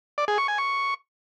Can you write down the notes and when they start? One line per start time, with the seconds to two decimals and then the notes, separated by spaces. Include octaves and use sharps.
0.18 D5
0.28 G#4
0.38 C#6
0.48 G#5
0.58 C#6